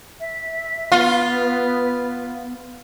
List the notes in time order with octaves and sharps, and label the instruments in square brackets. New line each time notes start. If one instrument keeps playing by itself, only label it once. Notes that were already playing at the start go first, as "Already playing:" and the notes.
[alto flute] E5
[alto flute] B3 [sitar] F4